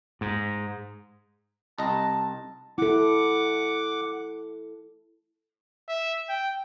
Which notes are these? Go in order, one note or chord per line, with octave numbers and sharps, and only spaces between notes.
G#2
C2 D#5 A5 A#5
E4 A4 F#5 D6
E5
G5